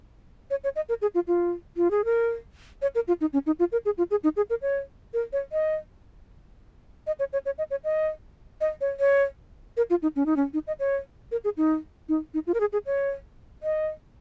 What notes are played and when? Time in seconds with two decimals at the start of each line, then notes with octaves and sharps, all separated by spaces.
0.50 C#5
0.64 C#5
0.76 D#5
0.89 A#4
1.02 G#4
1.15 F4
1.28 F4
1.77 F4
1.91 G#4
2.05 A#4
2.82 C#5
2.95 A#4
3.08 F4
3.21 D#4
3.33 C#4
3.46 D#4
3.59 F4
3.72 A#4
3.85 G#4
3.98 F4
4.11 G#4
4.24 D#4
4.36 G#4
4.50 A#4
4.62 C#5
5.14 A#4
5.33 C#5
5.52 D#5
7.07 D#5
7.19 C#5
7.33 C#5
7.46 C#5
7.58 D#5
7.71 C#5
7.84 D#5
8.61 D#5
8.81 C#5
9.00 C#5
9.77 A#4
9.90 F4
10.02 D#4
10.16 C#4
10.26 D#4
10.36 C#4
10.54 D#4
10.67 D#5
10.79 C#5
11.32 A#4
11.44 G#4
11.57 D#4
12.09 D#4
12.34 D#4
12.47 F4
12.54 A#4
12.60 G#4
12.73 G#4
12.86 C#5
13.63 D#5